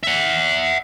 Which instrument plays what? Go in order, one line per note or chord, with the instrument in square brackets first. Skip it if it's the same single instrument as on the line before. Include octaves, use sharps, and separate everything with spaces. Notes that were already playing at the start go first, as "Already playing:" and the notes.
[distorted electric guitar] E5 F#5